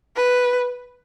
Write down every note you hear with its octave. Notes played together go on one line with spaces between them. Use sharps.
B4